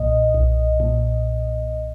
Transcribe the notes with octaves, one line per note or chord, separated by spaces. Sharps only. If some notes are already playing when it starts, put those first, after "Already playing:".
Already playing: B1 A#2 D#5
B1
A#2